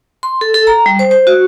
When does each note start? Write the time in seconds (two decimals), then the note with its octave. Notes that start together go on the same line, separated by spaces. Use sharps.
0.23 C6
0.41 A4
0.54 A4
0.67 A#5
0.86 G3
0.99 C5
1.11 C5
1.27 F#4